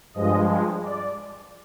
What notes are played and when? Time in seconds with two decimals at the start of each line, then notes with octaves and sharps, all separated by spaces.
0.14 G2 F3 G#3 D#5
0.82 D5